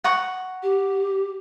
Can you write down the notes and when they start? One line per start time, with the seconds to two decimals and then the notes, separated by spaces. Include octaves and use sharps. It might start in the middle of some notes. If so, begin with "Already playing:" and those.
0.04 F#5 A#5 C#6
0.63 G4